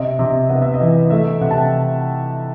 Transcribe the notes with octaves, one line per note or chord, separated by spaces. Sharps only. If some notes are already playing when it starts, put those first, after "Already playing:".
Already playing: C3 D#5
C3
B3 D#5
E5
D#5
E3
A3 E5
C3 F#5
A5
G5